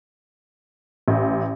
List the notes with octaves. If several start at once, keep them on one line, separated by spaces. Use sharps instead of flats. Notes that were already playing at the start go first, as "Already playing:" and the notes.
A1